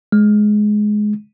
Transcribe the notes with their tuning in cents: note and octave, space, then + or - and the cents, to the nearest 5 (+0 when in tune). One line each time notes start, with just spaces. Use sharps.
G#3 +15